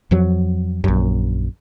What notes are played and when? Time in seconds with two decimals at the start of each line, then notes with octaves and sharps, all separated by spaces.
0.11 F2 F3 F#3
0.84 A#1 F#2